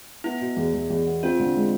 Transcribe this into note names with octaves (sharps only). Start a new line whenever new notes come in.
B3 E4
B2
E2
E2
E2
B3
C4 F4
D3
G#3